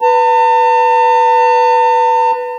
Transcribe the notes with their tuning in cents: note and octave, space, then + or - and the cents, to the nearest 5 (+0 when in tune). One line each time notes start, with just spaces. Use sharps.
B4 +0 A5 +45